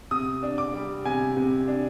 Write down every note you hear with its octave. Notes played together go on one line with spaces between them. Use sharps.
C3 D#6
D4
D6
G3
C3 G#5
C3
D4